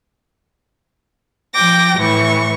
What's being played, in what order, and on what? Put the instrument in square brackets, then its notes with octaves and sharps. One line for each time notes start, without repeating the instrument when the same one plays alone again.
[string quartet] F3 G5 D6 A#6
A2 E3 C#6